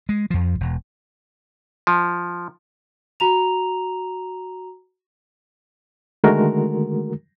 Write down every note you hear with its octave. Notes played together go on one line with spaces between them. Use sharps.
G#3
F2 F3
E1
F3
F#4 A#5 F7
D3 D#3 G#3 A3 F#4 A#4